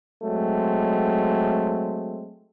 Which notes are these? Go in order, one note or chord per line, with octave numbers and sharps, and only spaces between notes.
F#3 G#3 A3 C4